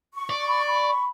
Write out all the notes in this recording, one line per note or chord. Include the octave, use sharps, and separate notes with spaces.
C#6
D5
B5
B5